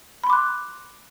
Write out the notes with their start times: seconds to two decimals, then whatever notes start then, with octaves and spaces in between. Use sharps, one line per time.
0.24 B5
0.27 C6
0.30 D6
0.33 F#6